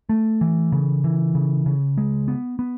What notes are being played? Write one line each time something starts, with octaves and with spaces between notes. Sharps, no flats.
A3
E3
C#3
E3
C#3
C#3
G#3
B3
B3